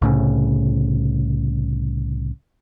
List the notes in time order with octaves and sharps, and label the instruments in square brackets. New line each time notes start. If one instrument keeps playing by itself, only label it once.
[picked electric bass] C2 A2 C#3